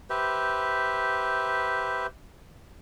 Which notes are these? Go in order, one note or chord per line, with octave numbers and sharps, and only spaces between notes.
G4 B4 C5 E5